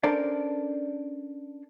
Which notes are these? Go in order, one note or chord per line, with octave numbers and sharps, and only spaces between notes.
C#4 D4 A4 A#4 C5 D5